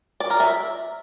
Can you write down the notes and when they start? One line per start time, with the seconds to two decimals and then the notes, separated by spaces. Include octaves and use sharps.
0.20 D5
0.30 A#4
0.40 E5